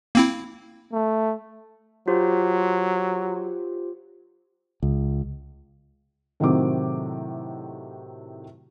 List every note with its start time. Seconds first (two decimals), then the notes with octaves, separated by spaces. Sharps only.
0.15 A#3 C4 E4
0.93 A3
2.08 F#3 F4 G4 C5
4.83 C#2
6.40 A2 C3 D#3 F#3 C4 D6